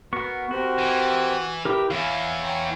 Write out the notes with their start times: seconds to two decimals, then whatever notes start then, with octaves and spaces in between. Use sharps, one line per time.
0.13 B3 F#4 A#4 C#6
0.51 C4 F#4 G4 A#4
0.78 E3
1.65 E4 G4 A#4 B4 G5
1.91 E2 E3 E4 C#5 F5
2.43 C#5 G5 A#5